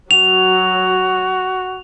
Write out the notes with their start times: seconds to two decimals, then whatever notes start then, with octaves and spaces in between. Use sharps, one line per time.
0.11 F#3 F#4 F7